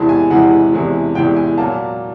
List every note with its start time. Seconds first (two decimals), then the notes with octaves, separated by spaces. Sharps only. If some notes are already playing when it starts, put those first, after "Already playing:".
Already playing: E2 C3 E3 G#3 A5
0.09 G#5
0.30 E2 C3 E3 G#3 F#5
0.73 E2 C3 E3 G#3
1.15 E2 C3 E3 G#3 G5
1.37 G#5
1.58 A#2 F#3 A#3 A5